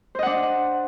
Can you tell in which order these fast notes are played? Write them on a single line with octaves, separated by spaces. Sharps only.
C5 D#5 F#5 D4